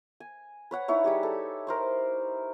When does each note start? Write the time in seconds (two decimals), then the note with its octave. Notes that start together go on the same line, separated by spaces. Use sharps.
0.20 G#5
0.71 B4 C#5 F#5
0.88 D#4 E4 C#5
1.04 G3 G4 G#4
1.23 A4
1.67 A#4 C5 C#6